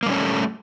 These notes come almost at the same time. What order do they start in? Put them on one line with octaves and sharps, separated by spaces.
A#3 G3 C#4 A4 A3